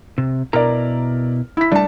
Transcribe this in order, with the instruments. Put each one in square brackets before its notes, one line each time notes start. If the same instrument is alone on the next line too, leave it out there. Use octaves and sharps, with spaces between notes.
[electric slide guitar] C3
[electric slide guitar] B2 E4 A#5 [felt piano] A#4 D5
[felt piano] E4 B6
[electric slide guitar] G3 A3 [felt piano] D4 A5